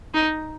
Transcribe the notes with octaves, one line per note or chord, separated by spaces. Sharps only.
D#4